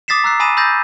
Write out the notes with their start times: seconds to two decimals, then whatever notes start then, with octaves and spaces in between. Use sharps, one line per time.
0.08 D6 D#6 A6 B6 C7 E7
0.24 A#5 E6 F#6 C7
0.40 G#5 B5 D#6 A#6 D#7 E7
0.57 B5 D#6 E6 G6 A6 A#6